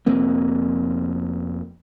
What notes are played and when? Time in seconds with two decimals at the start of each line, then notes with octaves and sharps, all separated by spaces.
0.06 F1 F2 A#3 C4